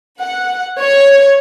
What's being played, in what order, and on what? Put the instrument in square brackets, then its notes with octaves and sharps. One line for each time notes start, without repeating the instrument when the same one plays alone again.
[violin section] F#5
C#5